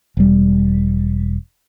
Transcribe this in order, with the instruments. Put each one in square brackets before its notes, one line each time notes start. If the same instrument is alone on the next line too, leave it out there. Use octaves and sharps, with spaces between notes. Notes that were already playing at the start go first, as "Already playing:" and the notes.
[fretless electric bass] E1 G3